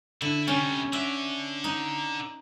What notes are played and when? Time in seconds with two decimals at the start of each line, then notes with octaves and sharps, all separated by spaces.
0.22 D3 E4
0.47 C3 G3 C#4
0.93 D3 D5 E5
1.64 D#4